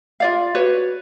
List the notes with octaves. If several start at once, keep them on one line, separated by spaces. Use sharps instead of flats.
F4 D5 F5
F#4 B4 C#5 D5